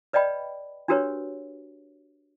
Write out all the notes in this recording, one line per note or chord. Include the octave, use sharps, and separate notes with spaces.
B4 D5 D#5 G5 B5
D4 F#4 G4 A#4 B4 C#5